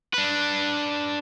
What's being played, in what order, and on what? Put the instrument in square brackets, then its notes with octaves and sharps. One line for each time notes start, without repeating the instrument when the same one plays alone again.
[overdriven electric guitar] D4 B4